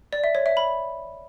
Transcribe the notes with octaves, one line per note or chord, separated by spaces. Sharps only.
D5
E5
C#5
E5
B5